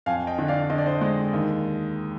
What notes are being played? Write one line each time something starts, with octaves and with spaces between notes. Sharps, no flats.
F2 F5 G#5
D#5 G5
D3
D5 F5
D3 D#5
D5
C5 D#5
G#3
D#2